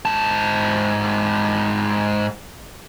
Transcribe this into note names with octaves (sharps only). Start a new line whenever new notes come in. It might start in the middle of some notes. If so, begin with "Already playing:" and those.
G#2 A5